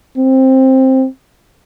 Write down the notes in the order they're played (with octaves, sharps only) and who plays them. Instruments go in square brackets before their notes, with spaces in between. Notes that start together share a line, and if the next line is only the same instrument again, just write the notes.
[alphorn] C4